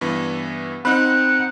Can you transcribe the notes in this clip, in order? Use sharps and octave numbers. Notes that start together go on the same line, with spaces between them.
G2 E3 B3
C4 D#4 F#5 B5 F#6